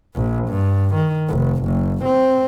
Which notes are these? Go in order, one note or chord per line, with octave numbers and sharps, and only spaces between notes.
A#1
G2
D#3
F1
F#1
C4